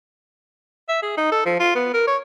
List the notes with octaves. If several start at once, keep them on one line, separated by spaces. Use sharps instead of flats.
E5
G#4
D#4
A4
F3
F4
B3
A#4
C#5